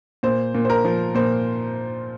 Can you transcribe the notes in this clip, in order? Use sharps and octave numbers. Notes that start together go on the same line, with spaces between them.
A#2 C5
A#2
C5
A#4
F3
A#2 C5